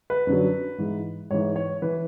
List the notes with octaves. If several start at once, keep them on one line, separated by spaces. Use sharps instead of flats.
B4
F#2 D3 F#3
G#2 E3
G#2 E3 C#5
C#5
E3 B4